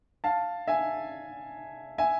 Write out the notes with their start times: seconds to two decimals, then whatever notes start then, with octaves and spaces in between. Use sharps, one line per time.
0.24 F5 A5
0.67 E5 G#5
1.98 E5 G#5